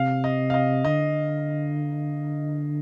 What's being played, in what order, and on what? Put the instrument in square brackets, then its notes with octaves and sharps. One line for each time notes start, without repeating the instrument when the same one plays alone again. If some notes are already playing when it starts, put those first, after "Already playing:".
Already playing: [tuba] C3 [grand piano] F5
[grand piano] D#5
F5
D#5
[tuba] D3 [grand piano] D#5